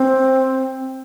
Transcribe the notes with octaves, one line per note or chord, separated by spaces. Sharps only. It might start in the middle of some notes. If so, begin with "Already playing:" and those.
Already playing: C4